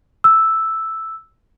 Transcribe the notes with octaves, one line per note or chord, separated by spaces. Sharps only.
E6